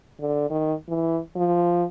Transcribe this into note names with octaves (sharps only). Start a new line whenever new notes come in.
D3
D#3
E3
F3